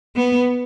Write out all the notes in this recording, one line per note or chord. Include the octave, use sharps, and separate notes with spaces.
B3